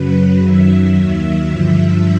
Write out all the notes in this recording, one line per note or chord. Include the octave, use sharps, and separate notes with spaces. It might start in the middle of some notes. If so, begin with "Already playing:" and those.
Already playing: F#2 C#3 F#3 B4
F#2 D#3 F#3 E5
D#2 D#3 F#3 E5
G2 D3 F3